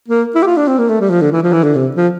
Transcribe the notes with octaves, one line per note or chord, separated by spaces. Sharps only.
A#3
E4
G4
F4
D4
C4
A#3
A3
G3
F3
D3
E3
F3
E3
D3
C3
F3